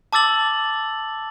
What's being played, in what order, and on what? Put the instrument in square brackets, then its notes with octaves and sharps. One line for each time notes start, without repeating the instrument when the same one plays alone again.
[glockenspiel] A5 D6 E6 A6 F#7